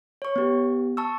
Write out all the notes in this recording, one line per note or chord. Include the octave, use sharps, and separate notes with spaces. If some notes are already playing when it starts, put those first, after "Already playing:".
C#5 C#6
B3 G4
A5 C#6 E6